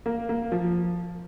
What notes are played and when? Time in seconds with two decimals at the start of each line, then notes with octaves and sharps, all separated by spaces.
0.06 A#3
0.29 A#3
0.52 F3